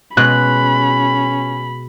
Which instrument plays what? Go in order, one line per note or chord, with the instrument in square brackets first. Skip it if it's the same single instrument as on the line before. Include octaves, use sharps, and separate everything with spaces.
[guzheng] B2 G#3 [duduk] C#4 [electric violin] B5 [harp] F#6